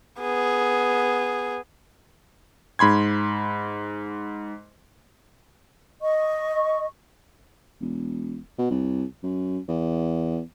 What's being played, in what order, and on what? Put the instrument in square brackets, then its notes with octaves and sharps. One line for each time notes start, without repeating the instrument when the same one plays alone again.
[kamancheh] B3 G#4
[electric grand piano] G#2 B5 C6 G#6
[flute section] D#5 C#6
[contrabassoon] E1
B2
C2
F#2
E2